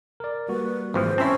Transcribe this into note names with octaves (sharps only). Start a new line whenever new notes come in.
A#4 D5
G3 A#3 F#4 B4
G#1 E3 F3 C5
C4 C#4 E4 A5 C6 E6